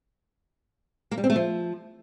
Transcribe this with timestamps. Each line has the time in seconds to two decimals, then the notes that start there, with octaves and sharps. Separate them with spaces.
1.11 A#3
1.18 G3
1.24 C4
1.30 A3
1.36 F3